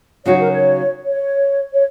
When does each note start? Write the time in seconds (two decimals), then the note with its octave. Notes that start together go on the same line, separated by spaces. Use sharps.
0.25 C#3 F#3 D#4 F#4 C#5
0.39 A#4
0.51 C#5
1.05 C#5
1.73 C#5